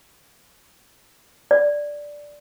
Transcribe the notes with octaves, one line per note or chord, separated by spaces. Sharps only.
D5